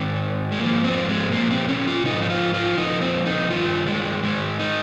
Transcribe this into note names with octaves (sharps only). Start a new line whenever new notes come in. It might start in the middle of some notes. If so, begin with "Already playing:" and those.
Already playing: G#2 D#3 C4
G#3
G#2 F3 A#3
C4
G#3
A#2 F3 A#3
C4
C#4
F4
G#2 F3 D#4
D#4
F4
F4
A#2 F3 D#4
C4
D#4
G2 D#3 F4
G#3
G#2 D#3 G#3
D#4